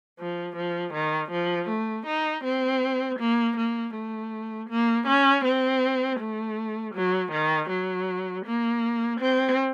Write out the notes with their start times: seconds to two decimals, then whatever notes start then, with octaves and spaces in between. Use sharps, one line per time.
0.19 F3
0.56 F3
0.94 D#3
1.31 F3
1.69 A3
2.07 D#4
2.44 C4
3.19 A#3
3.57 A#3
3.94 A3
4.69 A#3
5.07 C#4
5.45 C4
6.20 A3
6.95 F#3
7.32 D#3
7.70 F#3
8.45 A#3
9.20 C4